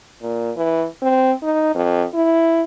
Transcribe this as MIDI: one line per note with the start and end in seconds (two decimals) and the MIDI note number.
0.22 0.51 46
0.56 0.86 52
1.02 1.32 60
1.43 1.70 63
1.75 2.05 41
2.14 2.63 64